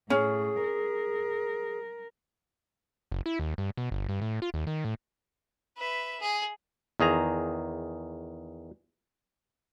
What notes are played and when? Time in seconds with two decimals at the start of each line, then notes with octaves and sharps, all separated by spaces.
0.10 A2 C#4 G#4
0.63 A#4
3.12 F#1
3.26 E4
3.39 D#2
3.58 G2
3.77 B2
3.91 G1
4.09 G2
4.21 A2
4.42 F4
4.54 D#2
4.67 D#3
4.85 A2
5.78 B4 E5
6.20 G#4
7.00 E2 D#3 G#4 A#5